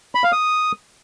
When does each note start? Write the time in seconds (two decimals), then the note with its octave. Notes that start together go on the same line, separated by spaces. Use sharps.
0.15 B5
0.24 F5
0.32 D#6